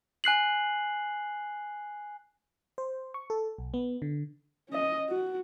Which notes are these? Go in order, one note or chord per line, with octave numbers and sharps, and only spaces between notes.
G#5 F#6 C7 F#7
C5
C#6
A4
B1
B3
D3
C#4 D#5
F#4